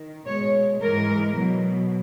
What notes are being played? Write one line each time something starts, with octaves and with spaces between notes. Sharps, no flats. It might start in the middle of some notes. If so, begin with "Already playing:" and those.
Already playing: D#3
B2 G#3 C#5
G#2 E3 G#3 A#4
B2 F#3